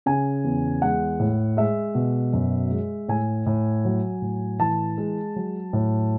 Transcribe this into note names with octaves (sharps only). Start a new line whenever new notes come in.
C#3 G#5
E2
G#3 F#5
A2
G#3 E5
B2
F#2
G#3
A2 G#5
A2
F#3
A2
E3 A5
G#3
F#3
A2